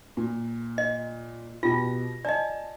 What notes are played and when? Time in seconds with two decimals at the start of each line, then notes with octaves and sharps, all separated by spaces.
0.17 A#2
0.78 D#5
1.63 B2 F4 G4 A#6
2.25 D5 D#5 G#5 A5